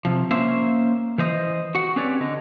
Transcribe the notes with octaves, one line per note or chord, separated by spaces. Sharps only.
C3 F3
A#3 C#4 C5 E5
E3 C5 D#5
F#4 F#5
C4 C#4 G4 B4 C#5 D5
D3 D#5